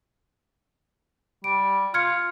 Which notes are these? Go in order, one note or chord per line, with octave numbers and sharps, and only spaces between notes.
G3 D7
F4 F6 G#6 C#7